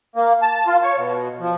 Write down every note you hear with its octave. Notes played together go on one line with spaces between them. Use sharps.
A#3
A5
F4
C#5
B2
F3